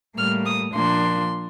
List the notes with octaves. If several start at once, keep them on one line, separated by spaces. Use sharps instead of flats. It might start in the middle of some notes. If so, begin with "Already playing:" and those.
A2 G3 A#3 F6
D#6
A#2 F3 A#3 D4 C6